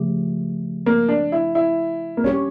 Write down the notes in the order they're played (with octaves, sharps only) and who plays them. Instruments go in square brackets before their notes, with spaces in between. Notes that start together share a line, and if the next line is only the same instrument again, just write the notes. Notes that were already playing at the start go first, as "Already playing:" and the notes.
Already playing: [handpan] C#3 F3 A3 G4
[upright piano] A#3
D4
E4
E4
A#3
[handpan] G3 D4 G4 C#5 [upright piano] C#4